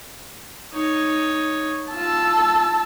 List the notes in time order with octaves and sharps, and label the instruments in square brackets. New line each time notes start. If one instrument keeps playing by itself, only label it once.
[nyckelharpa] D#4 C#5
[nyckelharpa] F4 [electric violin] A5 E6